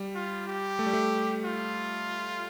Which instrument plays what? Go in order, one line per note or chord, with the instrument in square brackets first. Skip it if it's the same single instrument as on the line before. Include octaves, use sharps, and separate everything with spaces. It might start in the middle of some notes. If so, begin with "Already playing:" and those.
Already playing: [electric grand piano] G3
[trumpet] F4
G4
[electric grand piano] A3
G3
A3
[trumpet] F4